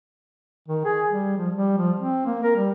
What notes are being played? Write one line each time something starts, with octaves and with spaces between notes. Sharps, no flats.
D#3
G#4
G3
F3
G3
F3
C4
A#3
A#4
G3